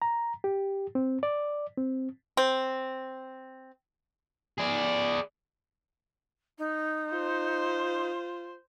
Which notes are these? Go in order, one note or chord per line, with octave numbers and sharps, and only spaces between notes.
A#5
G4
C4
D5
C4
C4
G#4 D5
D#4
F4 C5